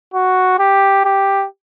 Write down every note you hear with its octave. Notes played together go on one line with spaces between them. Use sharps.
F#4
G4
G4